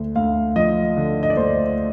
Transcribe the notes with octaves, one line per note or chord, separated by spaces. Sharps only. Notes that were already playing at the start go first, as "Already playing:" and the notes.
Already playing: D2 D3
D2 F5
F3 D#5
D3
D#5
D5
D2 C5